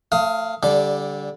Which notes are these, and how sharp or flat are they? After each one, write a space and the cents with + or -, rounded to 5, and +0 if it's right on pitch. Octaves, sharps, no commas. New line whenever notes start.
A3 +30 F5 +0 D#6 +20
D3 -20 G3 +0 D5 +0